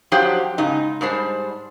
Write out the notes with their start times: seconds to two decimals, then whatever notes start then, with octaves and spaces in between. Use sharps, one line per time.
0.12 F3 F#3 D4 G4 C5 G5
0.58 G#2 C#3 D#4
1.01 G#2 G3 D4 C5